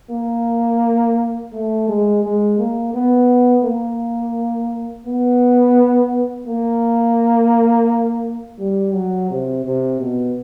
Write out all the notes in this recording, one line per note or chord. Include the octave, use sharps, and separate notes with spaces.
A#3
A3
G#3
G#3
A#3
B3
A#3
B3
A#3
G3
F#3
C3
C3
B2